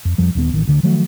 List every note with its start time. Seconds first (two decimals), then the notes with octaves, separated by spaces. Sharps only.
0.05 F2
0.18 F2 F3 G3
0.35 D#1 D#2 F3 B3
0.53 A1 D#3
0.67 D2 D3
0.83 D#3 F3 F#3 A3